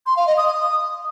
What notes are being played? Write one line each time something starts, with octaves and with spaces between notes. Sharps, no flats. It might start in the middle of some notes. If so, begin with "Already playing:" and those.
C6
F5
D#5
D#6
D#6